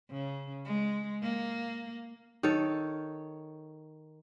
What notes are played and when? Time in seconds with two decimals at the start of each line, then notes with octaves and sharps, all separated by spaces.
0.11 C#3
0.65 G#3
1.22 A#3
2.43 D#3 A4 C#5